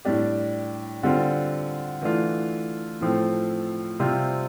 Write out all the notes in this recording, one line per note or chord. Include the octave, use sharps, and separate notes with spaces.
A2 G3 D4 G4
D3 G3 C4 F4
E3 A3 D4 F4
A2 F3 A3 C4
C3 G3 C4 F4